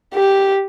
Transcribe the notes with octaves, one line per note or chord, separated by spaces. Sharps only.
G4